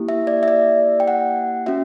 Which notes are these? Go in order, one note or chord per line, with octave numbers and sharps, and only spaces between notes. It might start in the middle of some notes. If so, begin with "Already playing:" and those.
Already playing: A#3 E4 G4
E5
D5
E5
D5
G5
F#5
C#4 F#4 E5